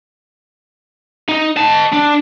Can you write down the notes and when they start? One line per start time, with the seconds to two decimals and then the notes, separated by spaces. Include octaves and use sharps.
1.29 D#4
1.57 D#5 A5
1.92 D4